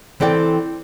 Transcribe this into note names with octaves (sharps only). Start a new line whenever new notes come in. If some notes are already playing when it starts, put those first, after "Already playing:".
E3 C4 A4 D5 G5